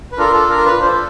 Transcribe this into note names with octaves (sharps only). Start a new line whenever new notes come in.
B4
D4 F4 A4 A#4
A4
A#4
B4
D4 F4 A4 C5